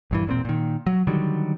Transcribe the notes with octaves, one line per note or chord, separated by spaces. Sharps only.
A#1 G2 E3
E1 A#2 B3 C4
A#2 D#3
F#3
D3 D#3 F#3 G3